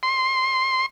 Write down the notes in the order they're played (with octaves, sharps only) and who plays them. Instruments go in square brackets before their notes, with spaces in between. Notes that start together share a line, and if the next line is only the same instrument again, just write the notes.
[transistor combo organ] C6